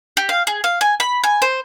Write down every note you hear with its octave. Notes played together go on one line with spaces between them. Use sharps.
G4
F5
G#4
F5
G#5
B5
G#5
C5